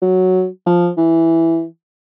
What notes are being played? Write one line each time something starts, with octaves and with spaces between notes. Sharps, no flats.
F#3
F3
E3